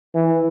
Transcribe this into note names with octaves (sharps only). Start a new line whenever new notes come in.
E3